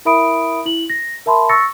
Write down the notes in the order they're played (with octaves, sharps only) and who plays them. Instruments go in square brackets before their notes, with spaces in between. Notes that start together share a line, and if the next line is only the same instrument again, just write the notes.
[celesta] E4 A#4 E5 B5 D#6 D7
E4 F#7
A#6
A#4 E5 A5 B5 C6
C#6 E6 A6 A#6 C#7